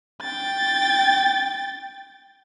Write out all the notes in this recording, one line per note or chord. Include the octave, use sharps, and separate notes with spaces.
G5 A6